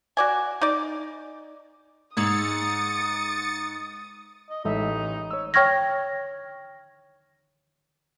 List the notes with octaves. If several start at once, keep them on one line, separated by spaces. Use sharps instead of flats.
F#4 D5 G#5
D#4 D5
G#2 G#4 C#5 D#6 E6 A6 C#7
D#5
A1 G#3 D#4 A4 E5
C#5 E6
C#5 G5 C#6 F6 G#6 A#6